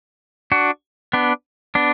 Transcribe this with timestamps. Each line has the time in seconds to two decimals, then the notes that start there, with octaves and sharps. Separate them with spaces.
0.52 D4 F#4
1.13 B3 D4
1.75 B3 D4